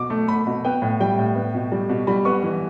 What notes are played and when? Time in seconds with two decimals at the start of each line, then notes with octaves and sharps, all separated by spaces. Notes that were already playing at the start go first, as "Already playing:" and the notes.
Already playing: B2 D6
0.10 A3
0.28 A3 B5
0.47 B2
0.65 B3 G5
0.82 A2
1.00 G3 G5
1.18 A2
1.36 B3
1.54 B2
1.72 G3
1.89 B2
2.07 G3 B5
2.25 B3 C#6
2.43 E3